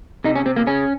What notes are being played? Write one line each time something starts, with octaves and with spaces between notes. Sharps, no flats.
C3 D#4
C#4
C3 C4
A#3
C#3 C#4